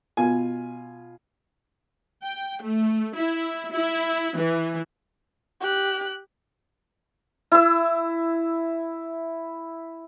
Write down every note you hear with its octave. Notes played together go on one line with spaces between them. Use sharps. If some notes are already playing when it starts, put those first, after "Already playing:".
B2 F4 G#5
G5
A3
E4
E4
E3
G4 F#6
E4 E6